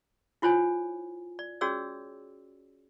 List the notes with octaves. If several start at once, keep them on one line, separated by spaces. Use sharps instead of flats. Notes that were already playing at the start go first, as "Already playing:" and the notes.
E4 F4 C5 C#5 G#5
D5
C#4 F#4 G#4 C#5 D5 E6